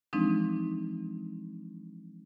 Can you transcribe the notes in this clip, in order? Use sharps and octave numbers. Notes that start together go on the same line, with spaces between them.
E3 F3 G#3 C4 D4 D#4